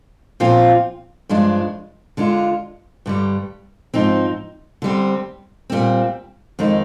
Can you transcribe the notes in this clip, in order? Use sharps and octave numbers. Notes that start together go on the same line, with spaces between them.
A#2 F3 C4 F4
G2 F3 G#3 D4
D3 G#3 D4 F4
G2 D3 G3
G#2 F3 C4 D#4
D3 G3 C4
A#2 G3 C4
F2 D#3 G#3 D#4